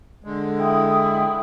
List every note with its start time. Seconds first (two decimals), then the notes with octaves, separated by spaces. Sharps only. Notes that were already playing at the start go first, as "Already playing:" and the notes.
0.24 D3 G#3
0.59 E4 G5 D#6